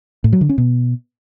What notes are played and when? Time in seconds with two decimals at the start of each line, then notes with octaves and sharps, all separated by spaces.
0.24 A2
0.33 F#3
0.41 D3
0.49 C#4
0.58 B2